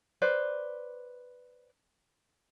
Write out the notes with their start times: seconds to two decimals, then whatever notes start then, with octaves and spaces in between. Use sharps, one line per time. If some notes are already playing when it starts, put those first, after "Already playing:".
0.22 B4 C5 D5